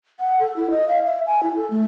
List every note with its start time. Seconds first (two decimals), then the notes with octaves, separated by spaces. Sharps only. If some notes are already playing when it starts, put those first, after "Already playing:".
0.20 F#5
0.40 A4
0.56 E4
0.71 D#5
0.88 F5
1.06 E5
1.27 G#5
1.43 E4
1.56 A4
1.71 A3